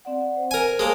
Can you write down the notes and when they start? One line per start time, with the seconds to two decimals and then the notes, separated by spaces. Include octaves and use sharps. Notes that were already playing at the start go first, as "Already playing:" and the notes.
0.05 C4 D5 F#5
0.37 C5
0.51 A#4 G#5
0.79 G#3 A#3 C#5 G#5 A5